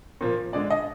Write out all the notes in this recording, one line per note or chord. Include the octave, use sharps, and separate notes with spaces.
A#2 F3 A#3
D3 G#3 D5
D#5